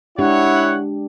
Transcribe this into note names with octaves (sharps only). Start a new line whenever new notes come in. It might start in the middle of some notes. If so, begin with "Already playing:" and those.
G#3 D4 E4 G4 C#5 F#5